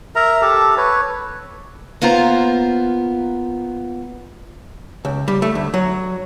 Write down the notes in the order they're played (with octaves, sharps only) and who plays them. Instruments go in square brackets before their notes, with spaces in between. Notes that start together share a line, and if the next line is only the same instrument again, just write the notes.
[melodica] A#4 E5 A#5
G4 A4 A5
B4 C#5
[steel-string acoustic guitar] A#3 B3 F4 C5 A#5
[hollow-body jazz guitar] C#2
G3
A3
D2
F#3